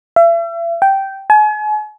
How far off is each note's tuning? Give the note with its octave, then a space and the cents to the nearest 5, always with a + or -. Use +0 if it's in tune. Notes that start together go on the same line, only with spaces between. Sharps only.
E5 +40
G5 -10
G#5 +40